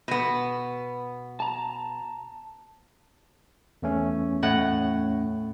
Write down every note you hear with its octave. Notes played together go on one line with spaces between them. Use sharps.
B2 B3
A5 A#5
E2 A3 C#4
A2 F#5